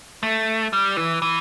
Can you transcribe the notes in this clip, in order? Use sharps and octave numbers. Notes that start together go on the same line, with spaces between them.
A3
G3
E3
E3